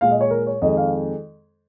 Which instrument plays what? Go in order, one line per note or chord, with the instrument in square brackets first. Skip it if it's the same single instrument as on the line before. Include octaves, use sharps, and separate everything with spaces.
[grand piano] A#2 G#3 F5
D#5
C#5
A#4
C#5
F2 D#3 G#3 D#5
F5